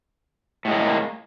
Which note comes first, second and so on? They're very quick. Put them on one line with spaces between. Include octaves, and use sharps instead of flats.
A2 G#3 A#3